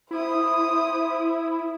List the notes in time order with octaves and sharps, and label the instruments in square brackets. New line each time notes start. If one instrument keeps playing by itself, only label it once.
[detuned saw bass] E4 [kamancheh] C5 D#6